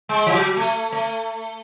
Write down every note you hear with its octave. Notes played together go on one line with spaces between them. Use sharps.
G#3
E3
F#3
A3
A3